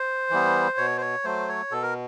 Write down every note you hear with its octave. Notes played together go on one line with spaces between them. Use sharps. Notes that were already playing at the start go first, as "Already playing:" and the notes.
Already playing: C5
E3 G3 B3
B2 C#5
C5
C#5
F#3 A3 C5
C#5
B2 A4
A#4